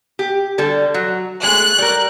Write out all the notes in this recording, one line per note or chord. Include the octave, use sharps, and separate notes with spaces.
G4
D3 G3 A4
F#3
G#3 A3 F#6
G3 A#4